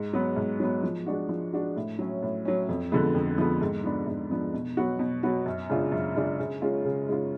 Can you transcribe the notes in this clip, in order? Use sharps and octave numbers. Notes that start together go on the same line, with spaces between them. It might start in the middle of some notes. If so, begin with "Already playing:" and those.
Already playing: G#2
F#3 B3
G#2
F#3 B3
F3
G#3 D4 F#4
F3
G#3 D4 F#4
A2
F#3 C#4
A2
F#3 C#4
F2
D3 F3 G#3 B3
F2
D3 F3 G#3 B3
G#2
F3 B3 D4
G#2
F3 B3 D4
B2
F#3 B3 F#4
B2
F#3 B3 F#4
F#2
C#3 G#3 D4 F4
F#2
C#3 G#3 D4 F4
C#3
G#3 C#4 F4
C#3
G#3 C#4 F4